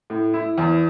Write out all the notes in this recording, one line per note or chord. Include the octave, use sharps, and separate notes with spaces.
A2
E4
E2